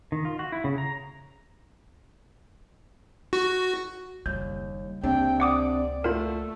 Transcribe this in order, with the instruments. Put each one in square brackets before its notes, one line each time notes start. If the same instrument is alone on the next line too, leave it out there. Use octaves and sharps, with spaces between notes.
[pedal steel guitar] D#3
F4
F#4
E4
C#3
A#5
[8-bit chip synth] F#4
[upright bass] F#1 G3 [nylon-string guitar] D#2 [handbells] G6
[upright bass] C#2 A#3 [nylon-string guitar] C3 C4 D4 [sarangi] G5
[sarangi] D5 [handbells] F#5 D6 D#6
[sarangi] A3 [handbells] F4 A#4 [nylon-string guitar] F#5